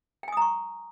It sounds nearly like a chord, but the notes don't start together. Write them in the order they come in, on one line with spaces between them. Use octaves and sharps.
G5 G#5 D#6 A#5 C#6